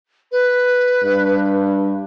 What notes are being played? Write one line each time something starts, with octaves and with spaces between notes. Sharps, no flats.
B4
G2